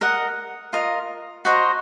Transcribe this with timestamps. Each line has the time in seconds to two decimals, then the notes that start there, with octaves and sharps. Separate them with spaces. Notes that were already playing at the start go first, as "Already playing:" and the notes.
0.01 A#4 D#5 F#5
0.73 F4 A#4 D#5
1.45 F#4 C5 D#5 A#5